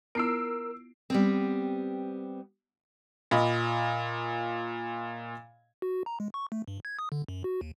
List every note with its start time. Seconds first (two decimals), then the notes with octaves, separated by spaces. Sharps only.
0.15 B3 E4 F4 A#4 E6 C7 D7
1.10 G3 B3 C4
3.31 A#2 D#5 B5
5.82 F#4
6.06 A#5
6.20 G#3
6.34 C#6
6.52 A3
6.68 G2
6.85 G#6
6.99 D#6
7.12 D3
7.28 F#2
7.44 F#4
7.61 D#2